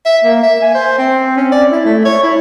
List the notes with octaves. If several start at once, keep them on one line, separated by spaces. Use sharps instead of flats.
E5
A#3
E5
G#5
C5
C4
C#4
D5
E4
A3
C#5
E4